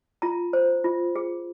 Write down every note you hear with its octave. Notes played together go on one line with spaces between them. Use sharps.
F4 A#5
C5
F4
G#4